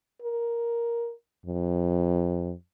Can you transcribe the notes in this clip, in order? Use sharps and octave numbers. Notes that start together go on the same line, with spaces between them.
A#4
F2